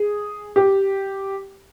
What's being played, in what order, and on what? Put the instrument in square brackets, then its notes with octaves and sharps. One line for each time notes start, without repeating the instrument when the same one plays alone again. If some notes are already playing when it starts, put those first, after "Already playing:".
Already playing: [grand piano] G#4
G4